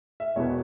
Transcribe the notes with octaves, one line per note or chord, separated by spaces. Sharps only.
E5
E1 E2 B2 B3 C#5